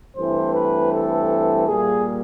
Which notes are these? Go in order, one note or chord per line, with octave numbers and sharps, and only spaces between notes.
G2 E3 A3 C4 C5
B4
A4
A#2 G3 A#3 G#4